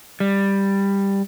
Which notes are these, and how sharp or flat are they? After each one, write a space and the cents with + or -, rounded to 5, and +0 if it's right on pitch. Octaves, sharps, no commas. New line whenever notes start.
G3 +10